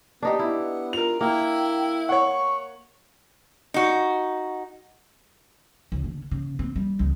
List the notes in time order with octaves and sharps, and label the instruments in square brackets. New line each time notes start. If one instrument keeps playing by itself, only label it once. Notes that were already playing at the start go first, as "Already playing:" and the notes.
[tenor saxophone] B3 [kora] D4 D#4 G4
[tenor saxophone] B3 [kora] E4
[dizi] F4 [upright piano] A#4 F7
[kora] A#3 [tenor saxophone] E4 [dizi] G5
[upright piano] C#5 F#5 [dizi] C#6
[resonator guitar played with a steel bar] D#4 F#4
[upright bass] C#2
D3
C#3
C4
G3
C#2